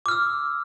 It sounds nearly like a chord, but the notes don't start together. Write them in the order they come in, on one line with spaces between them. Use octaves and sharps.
D6 F6 E6